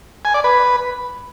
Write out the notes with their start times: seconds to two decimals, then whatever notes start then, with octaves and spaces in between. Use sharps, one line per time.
0.25 G#5
0.34 D5
0.44 B4